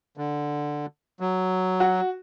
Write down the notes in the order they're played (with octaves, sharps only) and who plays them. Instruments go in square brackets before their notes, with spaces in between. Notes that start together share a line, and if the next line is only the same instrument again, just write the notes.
[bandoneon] D3
F#3
[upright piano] F#4